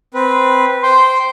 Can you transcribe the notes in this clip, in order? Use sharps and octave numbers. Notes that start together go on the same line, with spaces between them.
C4 B4
C5 G5 C6